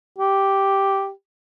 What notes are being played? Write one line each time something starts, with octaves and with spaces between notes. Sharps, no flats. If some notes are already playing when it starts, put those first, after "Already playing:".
G4